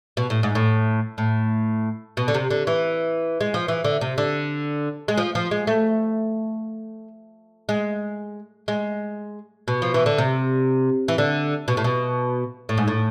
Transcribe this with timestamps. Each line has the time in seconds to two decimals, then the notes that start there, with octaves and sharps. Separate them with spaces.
0.17 B2
0.30 A2
0.43 G#2
0.55 A2
1.18 A2
2.17 B2
2.28 D3
2.34 C3
2.51 D3
2.67 E3
3.41 G#3
3.54 F3
3.68 E3
3.84 D3
4.01 C3
4.18 D3
5.08 G#3
5.18 F3
5.35 F3
5.51 G#3
5.67 A3
7.69 G#3
8.68 G#3
9.68 B2
9.82 F3
9.94 E3
10.06 D3
10.18 C3
11.08 E3
11.18 D3
11.68 B2
11.77 A2
11.84 B2
12.69 A2
12.78 G#2
12.88 A2